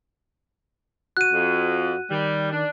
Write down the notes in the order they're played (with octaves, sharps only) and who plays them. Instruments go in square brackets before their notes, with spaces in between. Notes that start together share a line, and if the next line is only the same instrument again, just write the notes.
[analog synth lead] F#4 [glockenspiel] F#6 D#7
[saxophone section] F2
[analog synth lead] D#3 [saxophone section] G3
[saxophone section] D4